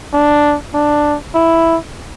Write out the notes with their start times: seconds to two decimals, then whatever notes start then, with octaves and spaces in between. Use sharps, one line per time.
0.13 D4
0.74 D4
1.34 E4